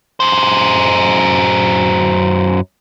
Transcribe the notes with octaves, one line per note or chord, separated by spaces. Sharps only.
F#2 C5